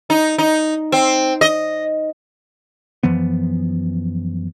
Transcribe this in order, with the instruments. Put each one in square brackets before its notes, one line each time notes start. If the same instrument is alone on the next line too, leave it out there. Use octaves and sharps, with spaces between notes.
[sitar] D#4
D#4
C4
D#5
[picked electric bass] F#2 E3 F3 B3